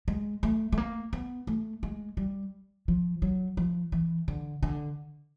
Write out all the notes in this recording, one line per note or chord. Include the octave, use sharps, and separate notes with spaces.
G#3
A3
A3
A#3
B3
A3
G#3
G3
F3
F#3
F3
E3
D3
D3